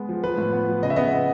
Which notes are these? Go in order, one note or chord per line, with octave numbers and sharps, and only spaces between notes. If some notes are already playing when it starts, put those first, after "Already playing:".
Already playing: G#3 B3
F3
F3 B4
A2
B3
F3
C#3 D#5
E5
B3 D#5
B3